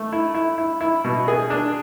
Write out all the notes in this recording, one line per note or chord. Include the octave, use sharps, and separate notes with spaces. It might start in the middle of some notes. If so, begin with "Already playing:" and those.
Already playing: A3
E4
E4
E4
E4
B2
G#4
D4